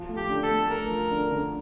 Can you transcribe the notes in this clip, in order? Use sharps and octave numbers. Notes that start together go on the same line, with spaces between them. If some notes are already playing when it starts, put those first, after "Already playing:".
Already playing: F3
A3
G4
D3
A4
A3
A3 A#4
F3
D3
D3